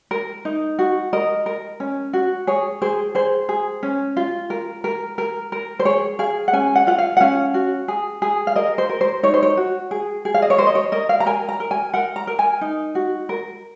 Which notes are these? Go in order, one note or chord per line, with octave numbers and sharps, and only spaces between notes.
A#4
D#4
F#4
A#4 D#5
A#4
C#4
F#4
G#4 C#5
G#4 C5
G#4 C5
G#4
C#4
F4
A#4
A#4
A#4
A#4
C5
G#4 C#5
G#4 F5
F#5
C#4 G#5
F#5
F4 F#5
F5
F#5
C#4 F5
F#4
G#4
G#4
F5
A#4 D#5
C5
A#4
C5
D#4 C#5
C5
C#5
F#4
G#4
G#4
F5
D#5
C#5
A#4 C5
D#5
C#5
A#4 D#5
F5
A#5
A#4 G#5
A#5
A#4
G#5
A#4 F#5
A#5
A#4
G#5
D#4
F#4
A#4